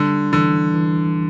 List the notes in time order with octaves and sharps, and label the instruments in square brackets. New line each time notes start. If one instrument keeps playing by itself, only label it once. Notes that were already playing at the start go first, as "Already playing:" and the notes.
Already playing: [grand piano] D3 [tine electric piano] G3
[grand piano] D3 [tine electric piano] E3
[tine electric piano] E3
E3